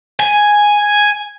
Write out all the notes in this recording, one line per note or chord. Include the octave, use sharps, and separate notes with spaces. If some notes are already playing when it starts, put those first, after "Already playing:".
G#5